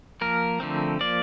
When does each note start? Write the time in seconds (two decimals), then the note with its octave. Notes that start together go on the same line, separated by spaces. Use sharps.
0.21 F3 A#3 A#4
0.60 D3 F3 A3 C4
1.00 F3 A#3 D5